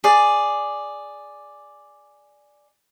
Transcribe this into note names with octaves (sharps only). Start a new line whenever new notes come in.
G#4 D5